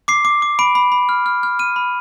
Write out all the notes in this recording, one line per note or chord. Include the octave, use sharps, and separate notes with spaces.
D6 C7
D6
D6
B5 D7
B5
B5
F6
F6
F6
F6 D#7
B5